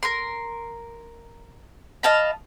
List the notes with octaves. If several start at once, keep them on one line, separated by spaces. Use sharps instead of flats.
A#4 C6
D#5 F5 A5 B5